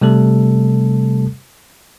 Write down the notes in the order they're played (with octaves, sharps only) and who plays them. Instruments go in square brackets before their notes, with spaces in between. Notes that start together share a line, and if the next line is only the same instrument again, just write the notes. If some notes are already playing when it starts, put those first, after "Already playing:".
[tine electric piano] C3 G3 A3 A4